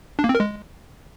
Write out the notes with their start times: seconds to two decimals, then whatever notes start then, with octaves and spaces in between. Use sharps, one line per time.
0.19 D4
0.24 A#3
0.29 C4
0.35 A#4
0.40 G#3